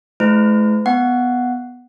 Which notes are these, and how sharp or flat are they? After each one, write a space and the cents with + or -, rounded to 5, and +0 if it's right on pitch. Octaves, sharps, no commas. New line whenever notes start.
A3 -45 E4 +0 B4 +45
B3 +0 F#5 +0